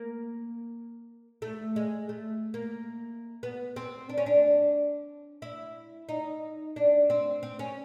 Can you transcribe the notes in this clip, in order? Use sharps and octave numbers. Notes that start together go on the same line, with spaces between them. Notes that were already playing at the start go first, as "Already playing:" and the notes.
Already playing: A#3
A3
G#3
A3
A#3
B3
C4
D4
C#4
D4
E4
D#4
D4
C4
C4
C#4